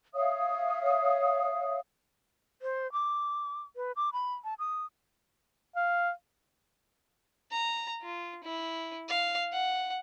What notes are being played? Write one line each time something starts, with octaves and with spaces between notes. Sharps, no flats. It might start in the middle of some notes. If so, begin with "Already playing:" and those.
C#5 E5 F5 D#6
C5
D6
B4
D6
B5
A5
D#6
F5
A#5
F4
E4
F5
F#5